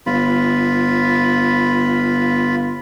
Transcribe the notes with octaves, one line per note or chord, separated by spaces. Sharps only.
G1 F4 B5